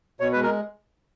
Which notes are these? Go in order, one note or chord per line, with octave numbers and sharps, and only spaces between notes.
B2 C#5
B4
G#3
A#4